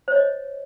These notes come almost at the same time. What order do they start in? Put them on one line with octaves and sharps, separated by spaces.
C5 C#5 D#5